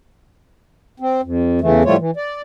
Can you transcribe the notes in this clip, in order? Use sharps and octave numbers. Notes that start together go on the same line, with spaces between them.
C4
F2
E2 C#3 E3 A3
A2 F3 G3 A3 F4 C#5
E3
D5